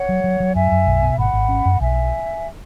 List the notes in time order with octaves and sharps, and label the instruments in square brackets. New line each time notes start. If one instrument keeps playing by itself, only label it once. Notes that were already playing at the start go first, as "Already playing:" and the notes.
Already playing: [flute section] C#5 F#5
[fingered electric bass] F#3
F#3
F#3
[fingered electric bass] F#2 [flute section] E5 G#5
[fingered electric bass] F#2
B1
B2
[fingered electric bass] G#1 [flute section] F#5 B5
[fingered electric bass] G#1
C#4
F#2
[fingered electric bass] B1 [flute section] E5 G#5